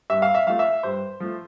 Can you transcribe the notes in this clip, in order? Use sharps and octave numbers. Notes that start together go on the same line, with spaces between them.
G2 E5
F5
E5
F3 A3 F5
E5
G2 C5
F3 A3